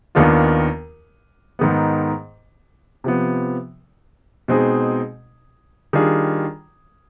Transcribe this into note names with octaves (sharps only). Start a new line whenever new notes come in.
D#2 D#3 B3 D4 F4
G#2 D#3 B3
C3 F3 B3
B2 G#3 C4 D#4 G#4
D#3 G3 D4 F4 G#4